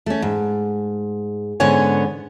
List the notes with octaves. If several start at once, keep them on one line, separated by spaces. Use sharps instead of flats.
A3 C#4
G#2
G#2 D3 B3 C#4 C#5 G#5